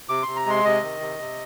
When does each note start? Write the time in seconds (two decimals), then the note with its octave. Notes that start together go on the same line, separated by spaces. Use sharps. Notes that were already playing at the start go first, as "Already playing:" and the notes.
0.09 C3 D6
0.23 C3 C6
0.36 A#5
0.46 G#3 C6
0.65 C3 D#5
0.83 D#3
1.00 C3
1.19 C3